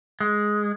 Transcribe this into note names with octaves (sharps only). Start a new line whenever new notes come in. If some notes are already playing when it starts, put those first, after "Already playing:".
G#3